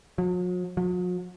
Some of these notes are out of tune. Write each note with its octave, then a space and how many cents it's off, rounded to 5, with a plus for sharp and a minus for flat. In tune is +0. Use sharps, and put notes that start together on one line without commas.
F#3 -45
F#3 -45